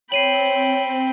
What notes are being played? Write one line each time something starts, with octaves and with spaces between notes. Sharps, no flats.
C4 C#5 G5 B5 C7 D#7 F#7